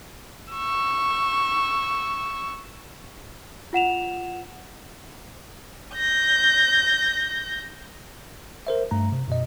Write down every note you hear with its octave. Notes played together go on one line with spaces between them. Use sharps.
C#6 E6
F4 F#5 E7 F7
G6 A#6
A#4 C5 E5
G2 A3 A#5
C3
F#2 B2 D#5